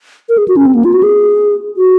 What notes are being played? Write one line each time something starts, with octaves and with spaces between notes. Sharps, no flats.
A#4
G#4
F#4
C#4
C4
A#3
F4
F#4
G#4
F#4